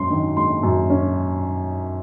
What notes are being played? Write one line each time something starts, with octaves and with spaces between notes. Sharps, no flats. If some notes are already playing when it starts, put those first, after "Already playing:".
Already playing: F#2 G#3 C#4 C6
D#3
G#3 C6
F#2
C#4